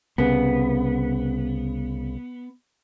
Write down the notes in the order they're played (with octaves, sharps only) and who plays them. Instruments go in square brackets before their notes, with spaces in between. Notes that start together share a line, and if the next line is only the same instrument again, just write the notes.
[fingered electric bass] C2 C#3 [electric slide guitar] B3